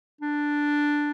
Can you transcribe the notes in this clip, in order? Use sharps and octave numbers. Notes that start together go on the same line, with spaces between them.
D4